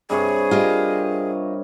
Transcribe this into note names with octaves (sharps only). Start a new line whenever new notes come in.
G2 C3 G#4 C#5
F4 G4 A#4 D#5